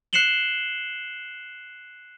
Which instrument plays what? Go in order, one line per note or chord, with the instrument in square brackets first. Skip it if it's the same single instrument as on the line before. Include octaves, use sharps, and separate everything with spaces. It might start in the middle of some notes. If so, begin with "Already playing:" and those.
[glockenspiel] F#6 C7 C#7 E7 F#7 G7